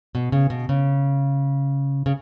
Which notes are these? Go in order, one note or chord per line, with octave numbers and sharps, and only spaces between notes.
B2
C#3
B2
C#3
C#3